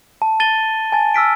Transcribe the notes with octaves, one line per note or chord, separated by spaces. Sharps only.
A5
A6 D#7 G7
G#5 A5 A6
E6 F6 B6 D7